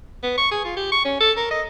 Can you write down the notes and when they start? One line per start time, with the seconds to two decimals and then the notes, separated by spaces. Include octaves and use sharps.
0.23 B3
0.37 C#6
0.51 G#4
0.65 F4
0.76 G4
0.92 C#6
1.05 C#4
1.20 A4
1.37 A#4
1.51 D#5